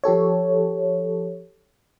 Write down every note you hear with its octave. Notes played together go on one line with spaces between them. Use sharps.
F3 G4 A4 C#5